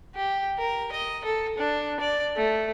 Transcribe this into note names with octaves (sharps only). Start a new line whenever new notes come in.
G4
A#4
D#5
A4
D4
D5
A3